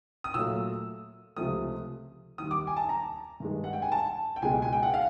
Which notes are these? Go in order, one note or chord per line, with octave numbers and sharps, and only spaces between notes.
D#6
A#2 F#3 A3 E6
C#2 C3 F3 A3 D#6
D#2 D#3 G3 D#6
D6
G#5
A5
A#5
G2 D#3 G#3
F#5
G5
G#5
A5
G5
C#2 B2 G#3 G#5
G#5
G5
F#5
F5